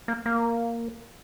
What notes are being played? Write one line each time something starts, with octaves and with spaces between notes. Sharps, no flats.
A#3
A#3